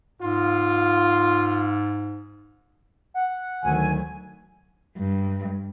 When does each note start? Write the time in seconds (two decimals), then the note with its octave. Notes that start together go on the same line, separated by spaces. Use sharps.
0.21 G#2 F4
3.14 F#5
3.63 D2 D#3 F#3 G#5
4.98 G2